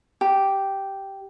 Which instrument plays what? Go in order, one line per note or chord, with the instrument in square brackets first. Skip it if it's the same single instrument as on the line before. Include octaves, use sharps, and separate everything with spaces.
[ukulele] G4